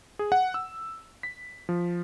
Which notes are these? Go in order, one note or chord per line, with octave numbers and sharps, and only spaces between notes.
G#4
F#5
E6
B6
F3